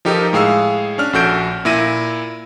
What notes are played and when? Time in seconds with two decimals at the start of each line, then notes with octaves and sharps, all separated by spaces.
0.05 F3 D#4 G4 A4 A#4 D#5
0.33 A2 G#3 G#4 F5 G#5 E6
0.98 C#4 D4 F6
1.13 A#1 C#4 F#4 A4 G6 D7
1.65 A#2 E4 A#6 D#7